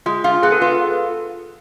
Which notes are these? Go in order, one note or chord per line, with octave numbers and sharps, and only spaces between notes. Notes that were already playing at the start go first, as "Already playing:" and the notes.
G#3 F4
F4
B3 G#4
A4
F4 B4
A4